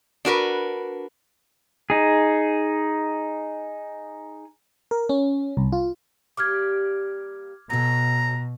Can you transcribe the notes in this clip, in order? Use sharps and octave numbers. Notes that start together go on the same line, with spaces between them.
D4 F#4 A#4 B4
D#4 G#4
A#4
C#4
C2
F4
G3 A#3 G4 D6 F6 G#6
B2 F#3 A4 A#5